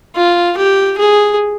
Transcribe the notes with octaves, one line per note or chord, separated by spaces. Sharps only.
F4
G4
G#4